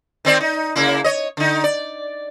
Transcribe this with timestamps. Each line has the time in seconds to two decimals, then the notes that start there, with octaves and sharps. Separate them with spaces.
0.25 D#3 C4 D5
0.41 D#4
0.76 C#3 A#3 E4
1.04 C#5 D#5
1.37 D3 D#4
1.64 D5